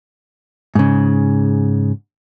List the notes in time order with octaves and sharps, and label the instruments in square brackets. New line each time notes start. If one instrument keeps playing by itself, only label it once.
[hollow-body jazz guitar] G#2 C#3